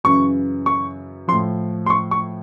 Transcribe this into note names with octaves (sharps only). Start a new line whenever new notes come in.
F#2 C#3 E3 C#6
C#6
A2 F3 C6
C6
C#6
C#6